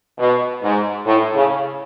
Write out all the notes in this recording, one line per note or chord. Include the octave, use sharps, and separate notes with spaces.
B2
G#2
A2
C#3